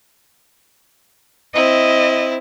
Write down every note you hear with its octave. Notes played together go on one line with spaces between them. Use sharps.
C4 E4 D#5